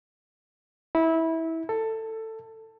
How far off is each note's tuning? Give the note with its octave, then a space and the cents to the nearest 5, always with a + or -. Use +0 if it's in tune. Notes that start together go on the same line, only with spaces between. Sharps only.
E4 -20
A4 +15